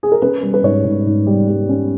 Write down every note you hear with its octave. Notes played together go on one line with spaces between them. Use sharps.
G#4
A#4
C#4 B4
G3
B4
G#2 C#5
G#2
G#2
G3
G3
C#4